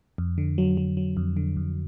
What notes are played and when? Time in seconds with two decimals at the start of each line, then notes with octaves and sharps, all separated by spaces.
0.18 F2
0.38 D3
0.58 F#3
0.77 F#3
0.97 F#3
1.17 F2
1.37 D3
1.57 F2